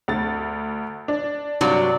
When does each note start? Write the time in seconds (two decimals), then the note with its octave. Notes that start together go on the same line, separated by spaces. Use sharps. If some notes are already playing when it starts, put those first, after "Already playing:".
0.08 D2 A6
1.08 D4
1.61 G2 C3 F#3 F#4 D5